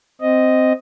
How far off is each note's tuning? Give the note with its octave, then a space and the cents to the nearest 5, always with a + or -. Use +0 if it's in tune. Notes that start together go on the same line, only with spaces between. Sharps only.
C4 -10 D#5 +0